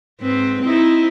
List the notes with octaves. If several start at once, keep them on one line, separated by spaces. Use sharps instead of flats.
G#2 C4 B4
C4 D#4 E4